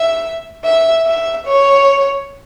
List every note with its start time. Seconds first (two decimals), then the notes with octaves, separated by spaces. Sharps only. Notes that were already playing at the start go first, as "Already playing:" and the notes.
Already playing: E5
0.64 E5
1.06 E5
1.47 C#5